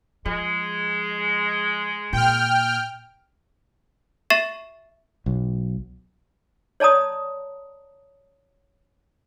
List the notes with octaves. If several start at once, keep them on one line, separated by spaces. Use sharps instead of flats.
F3 G#3
A#2 G5 F6
E5 C#6 A6 C7 D#7 E7
B1
C#5 D5 A5 A#5 D#6